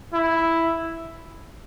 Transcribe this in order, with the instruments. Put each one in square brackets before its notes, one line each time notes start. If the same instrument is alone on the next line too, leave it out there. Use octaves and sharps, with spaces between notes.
[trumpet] E4